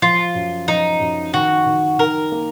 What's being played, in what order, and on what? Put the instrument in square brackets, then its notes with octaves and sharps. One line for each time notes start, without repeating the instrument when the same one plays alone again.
[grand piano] F3 [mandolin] F4
[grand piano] F#2
[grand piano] F3 [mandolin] D#4
[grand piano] F#2
[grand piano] D#3 [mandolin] F#4
[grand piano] D#3
[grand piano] D#3 [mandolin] A#4
[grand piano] A#3